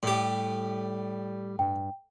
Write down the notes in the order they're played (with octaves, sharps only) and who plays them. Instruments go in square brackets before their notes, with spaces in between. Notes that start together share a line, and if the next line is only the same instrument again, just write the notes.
[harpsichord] A2 G4 [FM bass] G3
[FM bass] G2 [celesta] G5